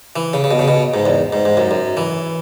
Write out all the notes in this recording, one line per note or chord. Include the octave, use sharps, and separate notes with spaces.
E3
C#3
C#3
B2
C#3
B2
G#2
E2
G#2
G#2
F#2
F#2
E3